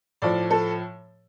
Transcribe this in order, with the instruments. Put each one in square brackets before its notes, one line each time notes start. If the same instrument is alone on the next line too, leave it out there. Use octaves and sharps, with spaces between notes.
[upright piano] A2 F3 D5
A4